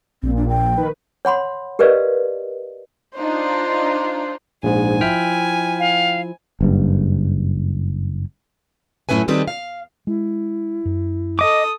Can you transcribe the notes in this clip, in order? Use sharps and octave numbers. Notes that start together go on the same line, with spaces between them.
A#1 A#2 C4
D4
G5
D#3 B4
C#5 F#5 B5 C6
G4 A#4 B4 D5 D#5 F5
D4 D#4 F4 C5
A#1 G#2 G#5
F3 E4 G5 F6 B6
F5
F#1 G2
F#2 A2 C#4 E4 B4 G#5
D#3 G3 C4 G#4 A4 B4
F5
G#3 E4
F#2
A4 D#5 D6 D#6